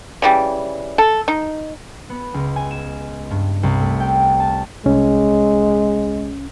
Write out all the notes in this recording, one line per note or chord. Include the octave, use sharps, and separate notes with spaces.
C#3 E3 G3
A4
D#4
B3
C#2
G#5
E7
G2
C2
A3
G5
A5
C2 G#3 C#4